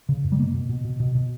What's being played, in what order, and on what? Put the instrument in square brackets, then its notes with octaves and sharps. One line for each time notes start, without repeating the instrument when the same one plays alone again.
[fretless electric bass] C#3
F#2
G3
B2 A#3
B2
B2
B2
B2
B2